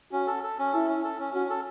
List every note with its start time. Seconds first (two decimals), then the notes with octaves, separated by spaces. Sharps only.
0.12 C#4 F#4
0.27 A4
0.44 A4
0.59 C#4
0.73 E4 A4
0.88 C#4
1.04 A4
1.20 C#4
1.34 C#4 F#4
1.50 A4